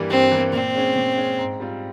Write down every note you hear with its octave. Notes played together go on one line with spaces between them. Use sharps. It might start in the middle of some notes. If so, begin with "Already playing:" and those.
Already playing: G2 E3 G3 A#3
G2 C4
E3 G3 A#3
A#2 C4
G#3 C#4
A#2
G#3 C#4
G#2
G3 C4 F4